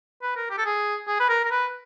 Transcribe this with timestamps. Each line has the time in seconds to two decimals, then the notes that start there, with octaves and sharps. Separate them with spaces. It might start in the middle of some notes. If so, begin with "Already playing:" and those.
0.22 B4
0.36 A#4
0.50 G4
0.58 A4
0.65 G#4
1.08 G#4
1.20 B4
1.29 A#4
1.45 A#4
1.51 B4